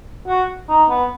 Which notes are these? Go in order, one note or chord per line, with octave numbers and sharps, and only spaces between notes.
F#4
D#4
B3